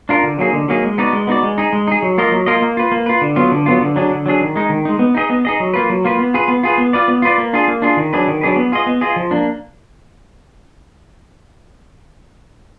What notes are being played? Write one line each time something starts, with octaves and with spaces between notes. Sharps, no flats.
D4 F4 A#4
D3
F#3 A#3 D#4 G#4
D3
F#3 A#3 D#4 G#4
G#3
B3 D#4 F#4 D5
G#3
B3 D#4 F#4 D5
G#3
D#4 G#4
G#3
D#4 G#4
F#3
A#3 F4 A#4 D#5
F#3
A#3 F4 A#4 D#5
A#3
F4 B4
A#3
F4 B4
D3
F#3 B3 F4
D3
F#3 B3 F4
D3
F#3 D4 G#4
D3
F#3 D4 G#4
D#3
G#3 D#4
D#3
G#3 D#4
B3
D#4 G#4 D#5
B3
D#4 G#4 D#5
F#3
A#3 F4 B4
F#3
A#3 F4 B4
B3
F4 G#4 B4
B3
F4 G#4 B4
B3
F4 B4 D5
B3
F4 B4 D5
A#3
D4 F4 G#4
A#3
D4 F4 G#4
D#3
F#3 D4 G#4 B4
D#3
F#3 D4 G#4 B4
B3
F4 G#4 D#5
B3
F4 G#4 D#5
F3
A#3 D4